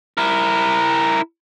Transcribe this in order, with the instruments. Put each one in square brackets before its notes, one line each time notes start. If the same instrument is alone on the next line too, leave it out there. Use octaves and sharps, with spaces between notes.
[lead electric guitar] E4 A#4